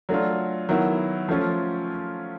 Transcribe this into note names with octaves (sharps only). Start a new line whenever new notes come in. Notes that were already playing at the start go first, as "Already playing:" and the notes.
F#3 A3 D4 F4
D#3 F#3 B3 E4
F3 A3 C#4 F4